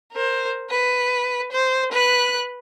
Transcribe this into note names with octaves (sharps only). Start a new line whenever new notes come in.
A#4 C5
B4
C5
B4 F#6